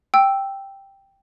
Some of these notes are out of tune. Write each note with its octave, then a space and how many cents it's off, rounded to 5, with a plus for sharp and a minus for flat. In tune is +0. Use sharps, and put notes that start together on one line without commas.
G5 +0 E6 +0